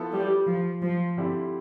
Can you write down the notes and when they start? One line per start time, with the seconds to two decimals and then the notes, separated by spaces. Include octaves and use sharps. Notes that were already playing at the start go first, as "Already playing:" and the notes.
Already playing: F3 B3 E4 A4
0.12 G3
0.46 F3
0.82 F3
1.17 D3 G3 C4 E4 G4